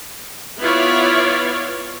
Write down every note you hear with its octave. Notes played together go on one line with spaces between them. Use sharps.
B3 E4 F4 C#5 D5